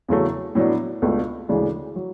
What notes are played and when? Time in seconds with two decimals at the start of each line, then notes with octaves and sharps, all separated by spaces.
0.08 E2 C#3 F#3 A3
0.55 A2 F#3 B3 D4
1.02 C#2 B2 A3 D4
1.49 D2 C#3 E3 G#3 D4
1.96 F#3